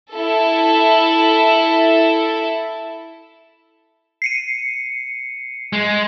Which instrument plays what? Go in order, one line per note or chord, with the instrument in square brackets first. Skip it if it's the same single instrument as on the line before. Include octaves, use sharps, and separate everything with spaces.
[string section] E4 A4
[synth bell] C7 C#7 D#7
[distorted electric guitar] G#3